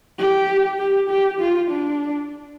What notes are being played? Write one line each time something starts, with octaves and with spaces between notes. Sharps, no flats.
G4
G4
G4
F4
D4